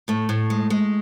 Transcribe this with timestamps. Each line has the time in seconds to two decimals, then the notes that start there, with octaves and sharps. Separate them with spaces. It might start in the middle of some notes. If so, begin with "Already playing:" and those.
0.08 A2 A3
0.29 A2
0.50 G#3
0.70 G#3